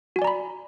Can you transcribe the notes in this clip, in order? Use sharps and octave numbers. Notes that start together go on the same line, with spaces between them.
F#4 D5 G#5 A#5 B5